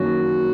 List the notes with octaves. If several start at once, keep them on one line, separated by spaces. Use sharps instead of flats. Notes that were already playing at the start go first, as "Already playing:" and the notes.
Already playing: F#2 D#3 F#3 A#3 C#4 F#4